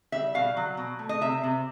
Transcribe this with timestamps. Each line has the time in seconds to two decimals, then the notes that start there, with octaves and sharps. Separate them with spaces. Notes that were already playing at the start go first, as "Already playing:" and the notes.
0.12 G3 E5
0.34 B2 F5
0.57 F#3
0.77 B2
0.99 A3
1.09 D#5
1.21 C3 E5
1.44 C3